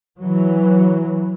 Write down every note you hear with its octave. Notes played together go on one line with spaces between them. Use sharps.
E3 F#3